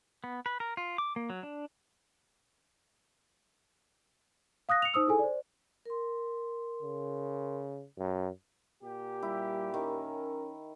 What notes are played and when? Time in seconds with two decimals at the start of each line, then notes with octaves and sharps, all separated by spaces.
0.24 B3
0.46 B4
0.60 A#4
0.77 F4
0.98 D6
1.16 A#3
1.30 F#3
1.43 D4
4.69 F5 D#6 F#6 A#6
4.82 C#7 F7
4.94 D#4 C5 D#6 E6
5.07 E4 G#4 A4 G#5
5.19 C5 D5
5.86 A#4 C6
6.82 C#3
7.98 F#2
8.82 A#2 G4
9.23 G3 E4
9.74 D#3 C#4 A#4